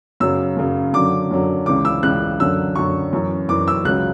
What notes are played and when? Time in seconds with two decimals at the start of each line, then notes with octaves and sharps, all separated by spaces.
0.20 F#2 C#3 F#3 E6
0.57 F#2 C#3 F#3
0.93 F#2 D3 F#3 D6
1.31 F#2 D3 F#3
1.66 C#2 C#3 E3 D6
1.85 E6
2.03 C#2 C#3 E3 F#6
2.40 F#2 D3 F#3 E6
2.75 F#2 D3 F#3 C#6
3.13 F#2 E3
3.49 F#2 E3 D6
3.68 E6
3.85 C#2 C#3 F#3 F#6